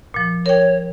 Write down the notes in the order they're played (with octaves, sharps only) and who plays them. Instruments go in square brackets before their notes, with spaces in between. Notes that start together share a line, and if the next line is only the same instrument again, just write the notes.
[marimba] A#2 F3
[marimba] A#4 G5 [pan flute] C#5